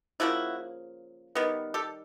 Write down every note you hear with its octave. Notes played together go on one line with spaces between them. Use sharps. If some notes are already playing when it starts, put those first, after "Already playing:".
C#3 F3 A#3 E4 F#4
D#3 G3 B3
G4 A4